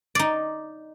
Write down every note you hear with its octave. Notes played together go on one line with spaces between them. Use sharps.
D#4 D5